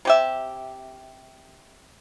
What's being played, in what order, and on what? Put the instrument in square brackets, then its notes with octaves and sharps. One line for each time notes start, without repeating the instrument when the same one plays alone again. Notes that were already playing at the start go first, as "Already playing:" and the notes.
[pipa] C3 G4 E5